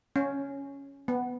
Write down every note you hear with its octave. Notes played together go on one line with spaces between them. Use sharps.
C#4
B3